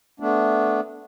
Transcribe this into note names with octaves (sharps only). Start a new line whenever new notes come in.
A3 B3 D4